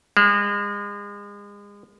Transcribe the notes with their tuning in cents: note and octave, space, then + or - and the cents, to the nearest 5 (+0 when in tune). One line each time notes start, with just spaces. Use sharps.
G#3 -35